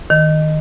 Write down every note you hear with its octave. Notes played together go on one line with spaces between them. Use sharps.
D#3